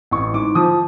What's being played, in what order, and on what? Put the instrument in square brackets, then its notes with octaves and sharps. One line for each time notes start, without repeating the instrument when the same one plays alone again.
[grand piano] A1 C#6
G#2 D6
F3 D#6